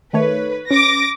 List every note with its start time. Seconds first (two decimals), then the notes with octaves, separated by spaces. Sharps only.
0.13 D#3 A3 B4 C#5
0.71 C#4 D6 A#6